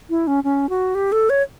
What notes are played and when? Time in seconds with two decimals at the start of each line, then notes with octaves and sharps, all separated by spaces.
0.10 E4
0.27 C#4
0.44 C#4
0.69 F#4
0.95 G4
1.12 A4
1.30 C#5